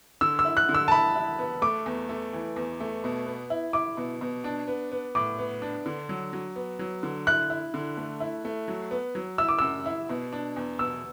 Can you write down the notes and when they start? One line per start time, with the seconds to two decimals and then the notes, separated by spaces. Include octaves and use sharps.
0.21 D3 E6
0.39 E6
0.45 E4
0.57 F#6
0.69 D3
0.75 E6
0.88 A5
0.91 E4 B5
1.16 E4
1.39 B3
1.62 A3 D6
1.86 E2
2.09 A3
2.33 E3
2.56 E2
2.80 A3
3.04 B2
3.26 B3
3.50 E4
3.73 E4 D6
3.97 B2
4.21 B2
4.44 D4
4.68 B3
4.92 B3
5.15 A2 D6
5.38 B3
5.62 D4
5.86 D3
6.09 F#3
6.33 F#3
6.56 B3
6.79 F#3
7.03 D3
7.27 E4 F#6
7.50 E4
7.74 D3
7.97 A3
8.20 E4
8.45 A3
8.68 F#3
8.91 B3
9.15 F#3
9.38 E4 E6
9.48 D6
9.59 F#2 E6
9.86 E4
10.09 B2
10.33 D4
10.56 E2
10.79 B2 E6